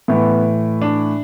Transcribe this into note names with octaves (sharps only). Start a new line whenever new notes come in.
A2 E3 B3
D4